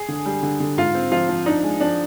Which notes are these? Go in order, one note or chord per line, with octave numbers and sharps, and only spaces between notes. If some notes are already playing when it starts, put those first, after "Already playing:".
Already playing: G#4
D3
G3
D3
D3
G#2 F4
C4
F3 F4
F3
D4 D#4
G#3
F3 D4